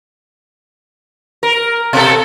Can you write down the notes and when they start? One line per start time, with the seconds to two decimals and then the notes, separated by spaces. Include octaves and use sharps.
1.43 A#4
1.93 B2 A4